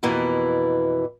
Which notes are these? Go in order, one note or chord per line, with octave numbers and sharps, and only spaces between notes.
F2 B2 E3 A#3 E4